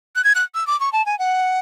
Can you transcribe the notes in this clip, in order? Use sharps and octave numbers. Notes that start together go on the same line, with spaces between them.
F#6
G#6
F#6
E6
D6
C#6
A5
G#5
F#5